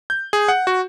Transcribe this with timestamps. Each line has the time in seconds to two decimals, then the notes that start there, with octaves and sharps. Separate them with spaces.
0.10 G6
0.33 G#4
0.48 F#5
0.67 F#4